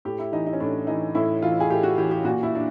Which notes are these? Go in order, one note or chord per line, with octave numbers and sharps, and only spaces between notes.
A2 G4
E4
E3 D#4
D#4
C#4
A2 D4
E3 D#4
A2 E4
E3 F4
G#4
A2 G4
F#4
E3 G4
G4
A#2 F#4
E4
D4